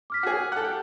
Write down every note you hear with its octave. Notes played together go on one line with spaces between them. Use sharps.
D6 F6 B6
F#4 G#4
A4 F#5
G4